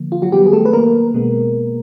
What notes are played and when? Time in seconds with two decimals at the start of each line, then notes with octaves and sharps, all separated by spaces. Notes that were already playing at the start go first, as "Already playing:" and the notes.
Already playing: D3 F3 A#3
0.12 F4
0.22 F#3 F#4
0.32 D#3 F#3 G3 B3 G4
0.47 G#4
0.53 A3 A4
0.65 B4
0.73 A#3 A#4
1.14 B2 G#3 B3